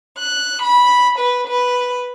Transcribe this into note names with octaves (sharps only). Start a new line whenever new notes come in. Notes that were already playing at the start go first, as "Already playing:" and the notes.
F#6
B5
B4
B4